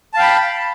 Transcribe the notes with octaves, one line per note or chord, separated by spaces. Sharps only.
F5 G5 A5 B5